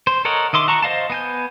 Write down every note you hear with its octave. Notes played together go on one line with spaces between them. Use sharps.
C5
A4 A#4 C#5 D#5 F#5
D#3 D#5 E5 C6 D6
F#4 A5 A#5 C#6
C5 D#5 F5 A5
B3 G#5 G6